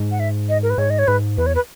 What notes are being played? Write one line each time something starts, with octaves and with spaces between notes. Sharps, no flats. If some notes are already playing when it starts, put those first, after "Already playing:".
Already playing: G#2
F#5
E5
D#5
A#4
B4
G#2 C#5
D#5
C#5
G#2 B4
E2 B4
C#5
B4